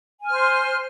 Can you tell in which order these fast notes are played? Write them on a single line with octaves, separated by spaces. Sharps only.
G#5 F6 C5